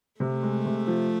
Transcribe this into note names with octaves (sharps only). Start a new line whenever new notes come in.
C3 A3
G#3
C3
F3